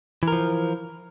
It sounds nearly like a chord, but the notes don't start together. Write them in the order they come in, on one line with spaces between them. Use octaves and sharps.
E3 A#4 F3